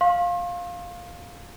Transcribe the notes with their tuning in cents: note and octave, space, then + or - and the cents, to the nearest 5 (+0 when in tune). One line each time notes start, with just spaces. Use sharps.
F5 +10 C6 +45